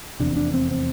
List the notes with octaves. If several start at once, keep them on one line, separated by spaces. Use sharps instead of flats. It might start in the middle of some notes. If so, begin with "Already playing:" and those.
F1 E2 C3 D4
D4
C4
C4